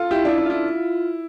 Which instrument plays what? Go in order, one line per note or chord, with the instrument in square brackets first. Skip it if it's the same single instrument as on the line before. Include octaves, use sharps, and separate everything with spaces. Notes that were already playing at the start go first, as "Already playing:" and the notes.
Already playing: [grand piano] F4 A4
[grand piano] E4 [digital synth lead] G4
[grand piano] D4 [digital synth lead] E4
[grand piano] D4
[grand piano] E4 [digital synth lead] F4